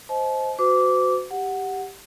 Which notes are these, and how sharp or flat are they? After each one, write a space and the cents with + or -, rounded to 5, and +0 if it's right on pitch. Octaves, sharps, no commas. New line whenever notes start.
C5 +0 D#5 +15 A5 -35
F#4 +0 C5 -45 D6 -15
G4 +0 F#5 +0